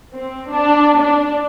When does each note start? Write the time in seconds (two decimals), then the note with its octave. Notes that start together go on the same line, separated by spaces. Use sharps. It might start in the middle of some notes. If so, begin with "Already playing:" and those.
0.14 C4
0.49 D4
0.97 D4